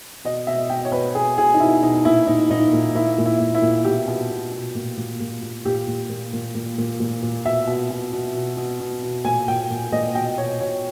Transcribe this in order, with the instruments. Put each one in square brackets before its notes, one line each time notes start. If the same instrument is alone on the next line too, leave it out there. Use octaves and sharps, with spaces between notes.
[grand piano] B2 D#5
B2 E5
B2 G5
C#5
B2 B4
B2 G#4
B2 G#4
D#4
B2 E4
B2 D#4
A#2 E4
A#2 D#4
A#2 D#4
A#2
A#2 E4
A#2
E4
A#2
E4
A#2
B2 G4
B2
B2
B2
A#2
A#2
A#2
A#2
A#2 G4
A#2
A#2
A#2
A#2
A#2
A#2
A#2
B2 E5
B2
B2
B2
B2
B2
B2
B2
A#2 G#5
A#2 G5
A#2
A#2 D#5
B2 G5
B2 C#5
B2 C#5